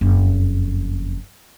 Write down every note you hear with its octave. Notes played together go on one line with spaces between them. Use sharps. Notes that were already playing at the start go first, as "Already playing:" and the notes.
F#1 F2